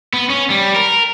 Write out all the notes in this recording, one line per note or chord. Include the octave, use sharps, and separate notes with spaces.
B3
C#4
G3
A#4